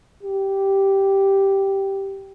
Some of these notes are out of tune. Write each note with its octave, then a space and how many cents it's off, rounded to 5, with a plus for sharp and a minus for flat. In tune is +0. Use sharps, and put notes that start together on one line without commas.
G4 -5